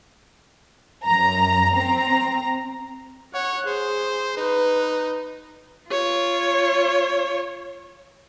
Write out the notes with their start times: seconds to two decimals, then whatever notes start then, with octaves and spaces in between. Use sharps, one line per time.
1.05 F#2 A#5
1.76 C4 A#5
3.35 C#5 F#5
3.67 G#4 C5
4.37 D#4 B4
5.91 F4 C#5